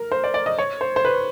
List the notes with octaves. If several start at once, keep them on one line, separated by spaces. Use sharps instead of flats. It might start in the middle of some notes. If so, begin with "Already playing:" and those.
Already playing: A#4
C5
D5
D5
D#5
C#5
C5
C5
B4